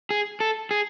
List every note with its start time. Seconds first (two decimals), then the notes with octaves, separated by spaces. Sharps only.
0.10 G#4
0.40 A4
0.71 G#4